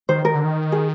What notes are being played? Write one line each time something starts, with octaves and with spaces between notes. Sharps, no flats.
D#3 C5
D#3 A#4
D3
D#3
G#4